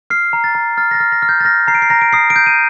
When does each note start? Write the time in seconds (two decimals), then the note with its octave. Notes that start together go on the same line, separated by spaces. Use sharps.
0.10 F6 C7
0.33 A#5
0.44 A6
0.55 A#5
0.78 F6 A6
0.91 A#6
0.94 A6
1.00 F6
1.12 A#6
1.22 F6
1.29 G6
1.40 A6
1.45 F6 A#6
1.67 A#5 C7
1.75 D7
1.82 C7
1.90 A#5 A#6
2.02 D7
2.13 D#6 C7
2.30 D7
2.36 G6
2.47 D#7